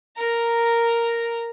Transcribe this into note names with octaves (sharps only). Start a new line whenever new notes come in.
A#4 A#5